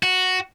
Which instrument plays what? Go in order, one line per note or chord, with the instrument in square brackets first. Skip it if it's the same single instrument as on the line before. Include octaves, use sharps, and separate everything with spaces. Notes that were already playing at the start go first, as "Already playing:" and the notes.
[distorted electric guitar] F#4